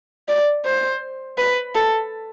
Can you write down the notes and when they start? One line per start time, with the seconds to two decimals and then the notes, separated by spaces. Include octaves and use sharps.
0.28 D5
0.65 C5
1.38 B4
1.75 A4